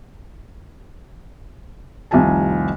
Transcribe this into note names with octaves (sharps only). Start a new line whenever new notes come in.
F1 C2 D#3 F4 G#5 A5